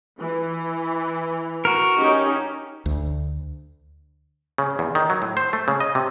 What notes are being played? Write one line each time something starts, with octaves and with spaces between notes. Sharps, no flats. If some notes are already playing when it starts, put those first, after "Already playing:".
E3
F#4 A#4
C#4 D#4 G4
D2
C#3
E2
D#3
F#3
A2
C5
A3
C#3
D#5
C3